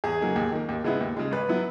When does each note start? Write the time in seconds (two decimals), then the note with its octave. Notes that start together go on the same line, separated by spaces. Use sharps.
0.04 E2 G#4
0.20 C#3 F#3 A#3 D#4
0.36 D#2
0.52 D#3 A#3
0.69 D#2
0.84 C#3 G#3 B3 E4
1.01 D#2
1.17 C#3 G#3
1.31 G#1 B4
1.49 F#3 B3 E4